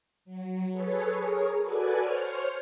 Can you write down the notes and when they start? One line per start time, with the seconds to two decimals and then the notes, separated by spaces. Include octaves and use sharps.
0.25 F#3
0.72 G#4 A4 B4 C#5
1.18 G#4 A#4 C#5
1.61 F#4 A4 B4 D5 G#5
2.00 C5 C#5 F6